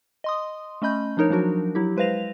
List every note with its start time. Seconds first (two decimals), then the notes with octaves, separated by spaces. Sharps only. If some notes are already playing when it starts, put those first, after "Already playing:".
0.24 D#5 C6 D#6
0.82 A3 C#4 D#5 B5 G6
1.17 F3 D4 D#4 A#4 C#5
1.30 F3 F#3 D4 F#4 A#4
1.75 F#3 E4 G4
1.97 G#3 B4 C5 F5 A#6 F7